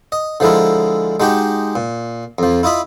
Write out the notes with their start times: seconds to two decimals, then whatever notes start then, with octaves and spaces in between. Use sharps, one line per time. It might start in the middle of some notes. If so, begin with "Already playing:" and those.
0.12 D#5
0.40 D3 F3 G#3 E4 A#4
1.20 G#3 D#4 F#4 G4
1.76 A#2
2.39 F2 F3
2.63 E4 F4 D#5 B5